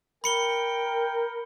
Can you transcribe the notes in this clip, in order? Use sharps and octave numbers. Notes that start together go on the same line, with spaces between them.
A#4 G5 B5 C#7 G7